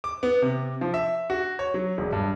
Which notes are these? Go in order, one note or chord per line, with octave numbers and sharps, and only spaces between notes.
D6
B3
C3
F3
E5
F#4
C#5
F#3
E1
G2